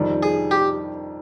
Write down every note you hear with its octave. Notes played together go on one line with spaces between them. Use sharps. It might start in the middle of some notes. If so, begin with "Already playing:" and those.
Already playing: F2 D#3 G3
G#4
G4